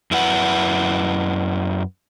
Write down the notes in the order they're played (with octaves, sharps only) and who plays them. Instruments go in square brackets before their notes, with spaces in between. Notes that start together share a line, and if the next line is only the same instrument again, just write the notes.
[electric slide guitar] F#2 E4 B4 F#5